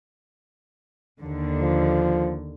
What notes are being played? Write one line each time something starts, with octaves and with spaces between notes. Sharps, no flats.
D#2 D3
F3